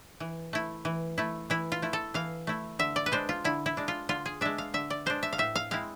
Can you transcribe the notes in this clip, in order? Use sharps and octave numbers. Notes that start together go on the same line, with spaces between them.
E3
A3 E4
E3
A3 E4
E3 E4
F4
A3 E4
A4
E3 F5
A3 E4
D3 E5
D5
B4
G#3 D4 C5
F4
D3 E4
E4
G#3 D4
F4
D3 F4
G#4
G#3 D4 E5
F5
D3 E5
D5
G#3 D4 C5
E5
F5
A2 E5
F5
G#3 C4 E4 F5